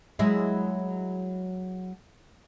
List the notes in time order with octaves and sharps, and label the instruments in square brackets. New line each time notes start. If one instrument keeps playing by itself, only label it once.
[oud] F#3 G#3 E4